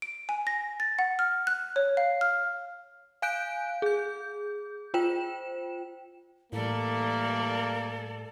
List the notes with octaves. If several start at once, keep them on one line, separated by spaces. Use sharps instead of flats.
D7
G#5
A#6
A6
F#5
F6
F#6
C#5
F5
F6
F5 G#5 F#6 G6 D7
G#4 G6
F4 C5 G5 E7
A2 E3 G3 A#3 A4 D5